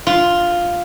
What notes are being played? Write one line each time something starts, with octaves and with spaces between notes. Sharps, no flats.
F4